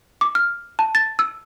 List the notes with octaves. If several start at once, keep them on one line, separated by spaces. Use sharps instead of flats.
D6
F6
A5
A6
E6